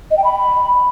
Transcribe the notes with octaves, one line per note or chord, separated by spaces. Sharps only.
D#5
G5
B5